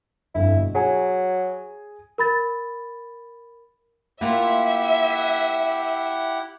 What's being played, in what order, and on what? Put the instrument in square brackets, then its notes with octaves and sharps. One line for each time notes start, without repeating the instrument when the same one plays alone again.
[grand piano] G1 F2 [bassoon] E4
[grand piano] B2
[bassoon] F#3 [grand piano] G#4 G#5
[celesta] A#4 B5 A6
[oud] A#3 F4 [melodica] E4 G4 F#5 [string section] E5